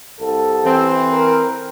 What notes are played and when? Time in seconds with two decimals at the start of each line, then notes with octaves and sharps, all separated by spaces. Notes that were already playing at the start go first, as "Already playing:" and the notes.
0.20 C2 A4
0.65 E3 C4
1.11 A#4